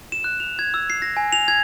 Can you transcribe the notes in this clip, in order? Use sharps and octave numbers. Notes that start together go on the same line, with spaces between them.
E7
F#6
F7
G#6
E6
C7
A#6
G#5
F7
G#6